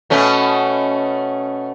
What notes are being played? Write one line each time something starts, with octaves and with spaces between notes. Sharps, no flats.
B2 A3 C#4